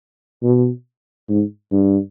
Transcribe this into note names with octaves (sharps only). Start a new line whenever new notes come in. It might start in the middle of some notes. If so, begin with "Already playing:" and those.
B2
G#2
G2